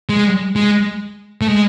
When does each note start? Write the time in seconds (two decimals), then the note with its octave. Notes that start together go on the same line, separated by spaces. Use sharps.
0.09 G#3
0.56 G#3
1.41 A3
1.48 G#3